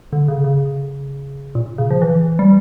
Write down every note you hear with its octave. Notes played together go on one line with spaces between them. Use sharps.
D3
C#3
C#3
A#2
C#3
F3
E3
G3